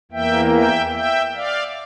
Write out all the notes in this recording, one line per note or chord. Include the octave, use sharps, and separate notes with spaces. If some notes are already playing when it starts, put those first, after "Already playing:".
E2 E3 A#3 E5 G5
E5 G5
E5 G5
D5 F5